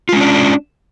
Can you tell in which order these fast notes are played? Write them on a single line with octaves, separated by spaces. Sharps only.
F4 G#3 C#4 D4